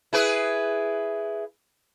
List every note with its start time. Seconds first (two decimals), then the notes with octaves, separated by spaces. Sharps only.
0.13 E4 G#4 B4